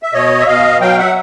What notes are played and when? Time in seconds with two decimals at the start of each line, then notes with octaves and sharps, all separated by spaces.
0.03 E5
0.13 B2 C#5 D#5
0.40 E5
0.47 B2 D#5 F5
0.81 F#3 F5 G5
0.98 E5 F#5